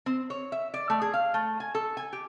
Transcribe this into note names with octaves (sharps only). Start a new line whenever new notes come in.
C4
C#5
E5
D5
A3
G#4
F5
A3
G#5
A4
G#5
G4